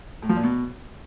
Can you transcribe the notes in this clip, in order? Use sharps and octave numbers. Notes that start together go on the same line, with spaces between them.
A2
F3
A#2
B2